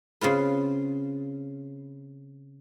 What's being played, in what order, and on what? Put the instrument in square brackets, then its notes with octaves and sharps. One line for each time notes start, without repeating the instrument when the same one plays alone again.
[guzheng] C#3 C4 F4 B4